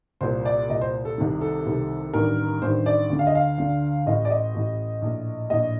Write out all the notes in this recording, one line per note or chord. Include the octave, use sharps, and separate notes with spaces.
C2 A#2 C5
D5
C2 A#2 D#5
C5
A4
C2 C3 D#3
A4
C2 C3 D#3
A1 G2 D#3 A#4
A1 G2 D#3 C5
D5
D2 D3
F5
D#5
F5
D2 D3
A1 A2 D#5
D5
D#5
A1 A2
A#1 A2
A#1 A2 D#5